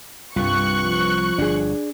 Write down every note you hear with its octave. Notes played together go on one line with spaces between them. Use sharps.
C2 G2 F4 C#6 F#6
F3
G1 D4 G#4